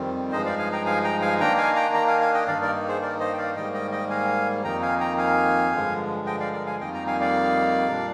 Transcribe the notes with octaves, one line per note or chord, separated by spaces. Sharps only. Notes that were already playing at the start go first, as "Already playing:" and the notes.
Already playing: F2 D#3 G3 C4
G2 F3 G#3 D#4 C5 D#5
D5 F5
F5 G#5
G5 A#5
F5 G#5
G5 A#5
F5 G#5
D#3 A#3 D4 G5 A#5
F5 G#5
G5 A#5
G5 A#5
F5 G#5
F5 G#5
D#5 G5
G2 D#3 A#3 D#4 D5 F5
A#4 D5
G#4 C5
A#4 D5
C5 D#5
G5
D5 F5
G#2 D#3 G3 A#3 D#5 G5
D#5 G5
D#5 G5
F5 G#5
F2 D#3 A#3 D#4 G5 A#5
F5 G#5
G5 A#5
F5 G#5
G2 D3 F3 G#3
D#5 G5
D5 F5
A#4 D5
F5 G#5
F2 D#3 G3 A#3 D#4 D#5 G5
G5 A#5
F5 G#5
D5 F5
A#2 G3 D4